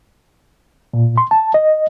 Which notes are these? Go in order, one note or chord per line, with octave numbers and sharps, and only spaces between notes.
A#2
C6
A5
D#5